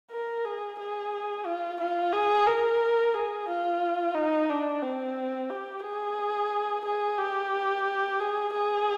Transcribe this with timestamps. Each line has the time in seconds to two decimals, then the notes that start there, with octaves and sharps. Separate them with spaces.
0.11 A#4
0.45 G#4
0.79 G#4
1.45 F4
1.80 F4
2.13 G#4
2.46 A#4
3.14 G#4
3.48 F4
4.15 D#4
4.50 D4
4.82 C4
5.50 G4
5.83 G#4
6.85 G#4
7.18 G4
8.20 G#4
8.53 G#4